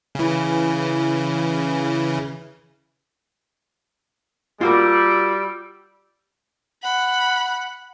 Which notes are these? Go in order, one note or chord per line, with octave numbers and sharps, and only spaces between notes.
C#3 E3
G3 F4 F#4 A#4 D6 E6
F#5 B5